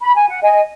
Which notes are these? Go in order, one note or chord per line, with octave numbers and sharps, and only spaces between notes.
B5
G#5
F#5
D#5 G#5